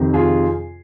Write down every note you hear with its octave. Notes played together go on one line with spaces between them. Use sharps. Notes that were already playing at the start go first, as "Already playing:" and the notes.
Already playing: F2 C3 D#3
F4 G#4